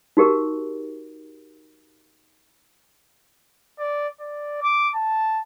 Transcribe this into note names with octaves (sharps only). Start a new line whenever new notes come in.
D#4 F#4 G4 A#4
D5
D5
D6
A5